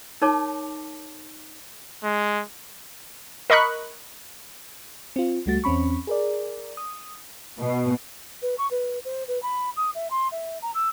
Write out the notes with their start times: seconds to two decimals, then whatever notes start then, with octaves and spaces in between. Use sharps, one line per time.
0.22 D#4 A#4 C#5 A5 D6
2.04 G#3
3.50 A#4 D#5 B5 C#6 F#6
5.16 C4 F4
5.46 C#2 G3 A3 F#4 A6
5.64 E2 C4 C#4 B5 C#6
6.07 G#4 A#4 D5
6.77 D#6
7.58 B2
8.42 B4
8.58 C#6
8.71 B4
9.05 C5
9.28 B4
9.42 B5
9.76 D#6
9.95 E5
10.10 C6
10.32 E5
10.62 A#5
10.74 E6